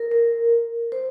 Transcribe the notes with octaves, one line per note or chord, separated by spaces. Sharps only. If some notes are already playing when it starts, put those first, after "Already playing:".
Already playing: A#4
A#4
C5